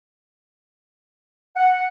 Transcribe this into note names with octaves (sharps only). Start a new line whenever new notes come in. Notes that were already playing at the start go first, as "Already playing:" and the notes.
F#5